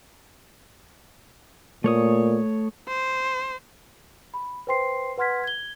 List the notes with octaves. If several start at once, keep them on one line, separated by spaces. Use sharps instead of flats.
A#2 A3 C#5 D#6
C5
B5
B4 C5 G5 C6 C7
B4 F#5 C6 F6 G#6 B6
G#6 G7